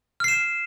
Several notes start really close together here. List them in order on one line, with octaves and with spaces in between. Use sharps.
F6 C7 E7